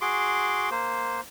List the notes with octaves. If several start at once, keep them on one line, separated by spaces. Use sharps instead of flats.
F#4 G#4 C6 D6
A#3 C5